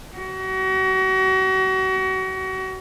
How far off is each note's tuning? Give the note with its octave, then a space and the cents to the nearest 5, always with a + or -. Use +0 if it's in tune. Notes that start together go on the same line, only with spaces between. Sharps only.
F#4 +35